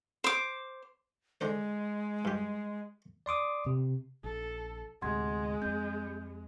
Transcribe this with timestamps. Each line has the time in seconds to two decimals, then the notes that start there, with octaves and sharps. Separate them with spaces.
0.24 C5 D6
1.41 D3 G#3 D4 C5
2.25 G2 G4
3.26 D5 C6 D6 D#6
3.66 C3
4.24 A#1 A4
5.02 D2 A2 C3 G#3 F#5 C6 G#6
5.62 F2 C4 G6